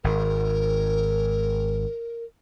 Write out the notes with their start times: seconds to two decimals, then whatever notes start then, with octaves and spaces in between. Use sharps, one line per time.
0.04 G#1 A#4